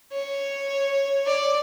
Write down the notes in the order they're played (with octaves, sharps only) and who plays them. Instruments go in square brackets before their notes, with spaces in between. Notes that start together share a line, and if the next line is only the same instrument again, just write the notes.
[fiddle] C#5
D5